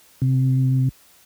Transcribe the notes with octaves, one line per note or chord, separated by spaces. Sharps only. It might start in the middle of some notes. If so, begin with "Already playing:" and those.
C3